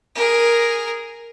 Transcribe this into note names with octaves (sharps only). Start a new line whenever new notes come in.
G#4 A#4